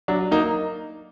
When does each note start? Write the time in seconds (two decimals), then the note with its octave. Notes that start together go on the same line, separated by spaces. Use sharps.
0.08 F#3 D4
0.31 A#3 D#4